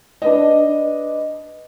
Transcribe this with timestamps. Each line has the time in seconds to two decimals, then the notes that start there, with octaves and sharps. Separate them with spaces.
0.22 D4 B4 D#5